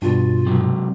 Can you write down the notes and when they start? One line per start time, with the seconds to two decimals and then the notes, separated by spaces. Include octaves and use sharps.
0.02 G2 B2 F4
0.46 C3 F#3